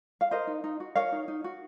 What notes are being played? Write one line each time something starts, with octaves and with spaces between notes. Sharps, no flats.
F5
A#4 C5 D#5
D#4
D#4
F#4
A#4 C#5 F5
D#4
D#4
F#4